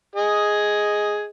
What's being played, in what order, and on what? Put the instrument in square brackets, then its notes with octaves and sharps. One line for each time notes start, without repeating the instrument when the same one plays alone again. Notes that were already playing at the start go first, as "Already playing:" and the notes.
[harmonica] G#4 D#5